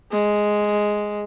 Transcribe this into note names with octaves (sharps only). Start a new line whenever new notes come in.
G#3